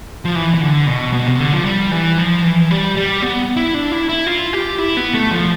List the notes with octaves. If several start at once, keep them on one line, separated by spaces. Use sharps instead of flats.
F3
E3
E3
D3
B2
B2
C3
D3
F3
G3
E3
F3
E3
G3
G3
B3
E4
D4
E4
E4
F4
G4
E4
B3
A3
F3